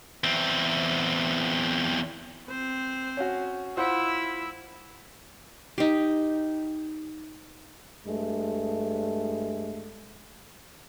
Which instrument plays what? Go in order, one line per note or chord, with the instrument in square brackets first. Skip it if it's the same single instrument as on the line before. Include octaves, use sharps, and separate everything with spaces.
[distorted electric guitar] E2 C4
[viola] C4 C5
[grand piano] C#4 F#4
[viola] E4 E5 [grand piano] F4 C5 F#5
[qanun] D#4 G4
[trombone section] G2 G#3 A3